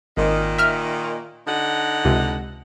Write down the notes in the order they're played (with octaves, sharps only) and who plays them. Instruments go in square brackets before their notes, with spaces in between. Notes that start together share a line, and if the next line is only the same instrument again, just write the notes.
[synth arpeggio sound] G#1 [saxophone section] A#2 D#3
[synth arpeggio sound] E5 F6
[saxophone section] D3 D#4 F#5
[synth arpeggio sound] C#2 C3